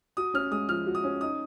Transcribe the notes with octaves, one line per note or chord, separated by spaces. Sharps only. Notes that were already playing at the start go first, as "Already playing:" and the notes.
F#4 D#6
C#4 F6
G#3 D#6
F3 F6
F#4
D#6
C#4
D#4 D#6